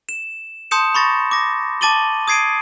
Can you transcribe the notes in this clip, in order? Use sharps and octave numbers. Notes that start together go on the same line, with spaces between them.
E7
A5 C6 D#6 G6 C#7 E7
B5 C#6 A6 A#6
D6 A#6
A5 D6 A6 D#7 F#7 G7
D#6 G#6 C7 D7 D#7